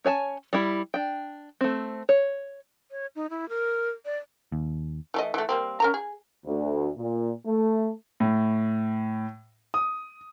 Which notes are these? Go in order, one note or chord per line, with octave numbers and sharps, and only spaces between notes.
C#4 C#5 G#5 A5
G3 E4
D4 G5
A3 C4
C#5
C#5
D#4
E4
A#4
D5
D#2
E3 A3 D#5
E3 A3
G3 A#3 C4
C#4 A#4 A#5
G#4
D2
A#2
A3
A2
D#6